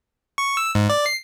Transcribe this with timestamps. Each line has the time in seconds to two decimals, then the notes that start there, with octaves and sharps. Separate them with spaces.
0.38 C#6
0.57 E6
0.75 G#2
0.90 D5
1.06 C7